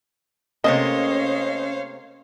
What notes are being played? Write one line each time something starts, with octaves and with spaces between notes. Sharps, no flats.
C3 A3 A#3 C#4 C5 C#5 D#5 F5